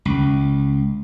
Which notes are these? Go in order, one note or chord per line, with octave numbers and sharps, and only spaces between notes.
C#2